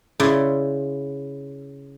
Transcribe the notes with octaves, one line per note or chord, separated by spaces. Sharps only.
C#3 E4 D5 C6